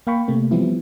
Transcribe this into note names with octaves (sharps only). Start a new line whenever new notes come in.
A#3 F5 G5 B5 C#6
C3 A3 A#3
E3 F3 G3 B3 C4 E4